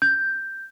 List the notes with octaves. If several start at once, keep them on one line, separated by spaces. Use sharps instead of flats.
G6